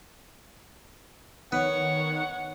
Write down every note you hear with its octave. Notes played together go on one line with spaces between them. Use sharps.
D#3 B3 C#5 F#5